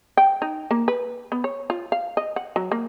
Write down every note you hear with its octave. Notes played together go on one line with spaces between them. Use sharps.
G5
D#4
A#3
B4
B3
C#5
F4
F5
D#5
F#5
F#3
A#3